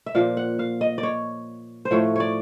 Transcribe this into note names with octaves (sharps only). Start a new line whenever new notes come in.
E5
A#2 F3 A#3 F5
F#5
F5
D#5
D5
C#5
C5
A2 F3 A3 C#5
C#5 D5